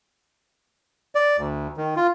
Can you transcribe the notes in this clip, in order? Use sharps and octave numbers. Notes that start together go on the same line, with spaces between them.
D5
D2
D#3
F4